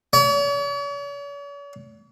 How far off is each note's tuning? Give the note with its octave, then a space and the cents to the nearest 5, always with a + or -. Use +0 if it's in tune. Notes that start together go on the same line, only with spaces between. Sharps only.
C#5 +45